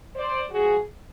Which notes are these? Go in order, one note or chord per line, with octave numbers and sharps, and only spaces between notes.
C5 D5
G#2 F3 G#3 F#4 G#4